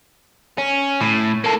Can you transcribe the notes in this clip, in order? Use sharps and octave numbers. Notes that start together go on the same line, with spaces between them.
C#4
A2
A#3 A4